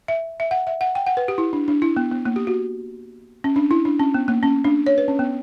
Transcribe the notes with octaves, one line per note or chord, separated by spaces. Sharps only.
E5
E5
F#5
E5
F#5
G5
F#5
B4
G4
E4
D4
D4
E4
B3
B3
A#3
G4
F#4
C#4
D4
E4
D4
C#4
B3
A#3
C#4
D4
C#5
B4
C#4
B3